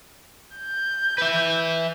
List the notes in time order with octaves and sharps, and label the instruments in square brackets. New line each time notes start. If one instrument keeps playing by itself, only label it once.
[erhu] G6
[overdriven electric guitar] B4 E5